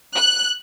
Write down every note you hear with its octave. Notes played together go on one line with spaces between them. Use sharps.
F#6